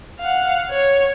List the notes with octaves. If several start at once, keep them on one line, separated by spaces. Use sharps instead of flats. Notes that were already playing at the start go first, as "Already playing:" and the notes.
F5 F#5
C#5